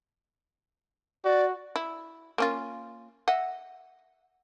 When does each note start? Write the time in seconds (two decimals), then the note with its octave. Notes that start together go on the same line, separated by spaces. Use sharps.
1.24 F#4 D5
1.76 E4
2.38 A#3 C#4 F4
3.28 D#5 E5 F#5